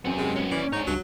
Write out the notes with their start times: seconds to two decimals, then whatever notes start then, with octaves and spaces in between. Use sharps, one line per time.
0.05 F#2 B3 C4 G#4
0.18 C3 G#3
0.36 B3 C#4
0.51 D#2 E3 C#4 D5
0.73 G#2 D4 D#4 C#5
0.87 C#2 G2 F#3